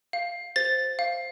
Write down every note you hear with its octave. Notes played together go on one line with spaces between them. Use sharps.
F5
C5 A6
F5